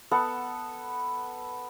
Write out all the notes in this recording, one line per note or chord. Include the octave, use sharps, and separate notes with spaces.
B3 A4 F#5